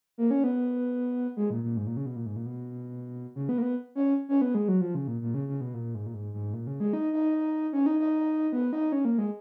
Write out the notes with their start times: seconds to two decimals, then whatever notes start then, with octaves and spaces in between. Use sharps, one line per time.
0.18 A#3
0.31 C#4
0.44 B3
1.37 G#3
1.50 A#2
1.63 A#2
1.77 G#2
1.87 A#2
1.97 C#3
2.06 B2
2.16 A#2
2.26 G#2
2.36 A#2
2.46 B2
3.35 C#3
3.49 B3
3.58 A#3
3.62 B3
3.95 C#4
4.29 C#4
4.42 B3
4.55 G#3
4.68 F#3
4.81 F3
4.95 C#3
5.08 A#2
5.21 A#2
5.34 C#3
5.48 C#3
5.61 B2
5.74 A#2
5.95 G#2
6.06 A#2
6.14 G#2
6.33 G#2
6.53 A#2
6.67 C#3
6.80 G#3
6.93 D#4
7.13 D#4
7.73 C#4
7.86 D#4
7.99 D#4
8.52 B3
8.73 D#4
8.92 C#4
9.05 A#3
9.18 G#3